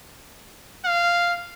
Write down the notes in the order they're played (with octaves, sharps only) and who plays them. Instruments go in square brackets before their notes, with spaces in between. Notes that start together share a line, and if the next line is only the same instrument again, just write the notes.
[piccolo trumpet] F5